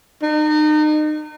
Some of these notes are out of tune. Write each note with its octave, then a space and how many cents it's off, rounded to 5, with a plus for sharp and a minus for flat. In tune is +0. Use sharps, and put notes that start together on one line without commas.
D#4 -35